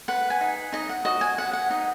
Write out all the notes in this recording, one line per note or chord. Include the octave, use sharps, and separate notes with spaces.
B4 F#5
G#5
D#4
D#4 D#5
F#5
F#4 D#5
G#5
B4 F#5
F#5
D#4 D#5